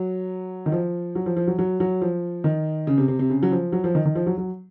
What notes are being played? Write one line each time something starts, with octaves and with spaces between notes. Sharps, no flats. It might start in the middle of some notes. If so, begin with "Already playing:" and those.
Already playing: F#3
D#3
F3
F#3
F3
F3
F#3
F#3
F#3
F3
D#3
C#3
C3
C3
C3
C#3
F#3
F3
F#3
F3
D#3
D#3
F3
F#3
F#3